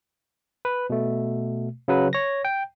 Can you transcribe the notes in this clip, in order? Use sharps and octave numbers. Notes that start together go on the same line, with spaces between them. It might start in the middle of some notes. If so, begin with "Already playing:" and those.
B4
B2 A3
C#3 F#3 B4
C#5 A#6
G5